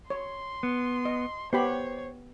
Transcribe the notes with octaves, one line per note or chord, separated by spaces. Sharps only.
C#5 C6
B3
D#5
B3 G4 C5 C#5 B5